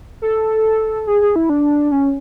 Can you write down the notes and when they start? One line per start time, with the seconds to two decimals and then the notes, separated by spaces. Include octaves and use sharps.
0.22 A4
1.07 G#4
1.21 G#4
1.36 E4
1.49 D4
1.91 C#4